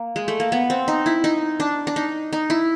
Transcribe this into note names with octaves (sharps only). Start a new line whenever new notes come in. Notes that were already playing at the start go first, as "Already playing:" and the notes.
Already playing: A#3
G#3
A3
A#3
B3
C4
D#4
E4
D#4
D4
D4
D#4
D#4
E4